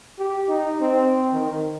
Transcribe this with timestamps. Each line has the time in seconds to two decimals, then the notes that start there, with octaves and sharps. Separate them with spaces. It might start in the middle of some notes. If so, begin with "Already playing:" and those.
0.19 G4
0.48 D#4
0.81 C4
1.33 D#3